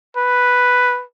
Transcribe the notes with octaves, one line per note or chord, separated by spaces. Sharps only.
B4